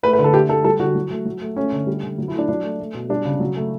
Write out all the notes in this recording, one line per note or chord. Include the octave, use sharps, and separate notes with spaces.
A3 B4
B4
D3
A4
A3 G4
D3 A4
G3 A4
D3 F#4
F#3
A3
F#3
A3
A3 C#4
D3
G3
D3
F#3
E4
A3 D4
F#3 D4
A3
A3
B2
G3 D4
C#3
F#3
A3